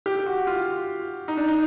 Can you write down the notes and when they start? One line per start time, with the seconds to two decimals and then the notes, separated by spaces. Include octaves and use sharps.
0.06 G4
0.26 F#4
0.47 F4
1.28 D#4
1.37 D4
1.48 D#4